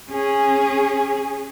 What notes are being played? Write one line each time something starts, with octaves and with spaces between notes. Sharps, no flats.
C#4 G#4